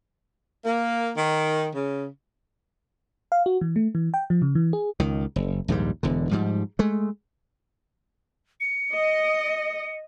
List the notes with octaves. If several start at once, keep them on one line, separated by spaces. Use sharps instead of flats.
A#3
D#3
C#3
F5
F#4
E3
A3
E3
G5
F3
C#3
E3
G#4
C#2 D#3
F#1
A#1 D#2 G#2 G3
E1 E2 D3
G#2 F3 G3
G#3 A3
C#7
D#5